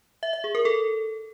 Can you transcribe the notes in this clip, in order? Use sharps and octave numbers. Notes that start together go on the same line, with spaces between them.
E5
E5
G#4
A#4
A4